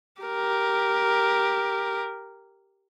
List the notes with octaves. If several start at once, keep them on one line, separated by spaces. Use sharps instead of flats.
G4 A#4